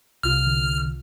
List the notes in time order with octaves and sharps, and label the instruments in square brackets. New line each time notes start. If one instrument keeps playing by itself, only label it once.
[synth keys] C2 C3 F4 [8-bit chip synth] F6
[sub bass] D3